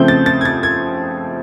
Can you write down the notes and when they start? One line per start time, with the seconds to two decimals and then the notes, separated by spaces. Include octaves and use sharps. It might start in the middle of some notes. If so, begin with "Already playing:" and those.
Already playing: C#3 F3 A3 C4 G6
0.08 A6
0.26 A6
0.41 G#6
0.45 A6
0.63 G#6